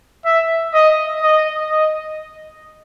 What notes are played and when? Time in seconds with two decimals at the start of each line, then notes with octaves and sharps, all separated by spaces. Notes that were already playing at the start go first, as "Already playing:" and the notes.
0.25 E5
0.74 D#5
1.22 D#5
1.70 D#5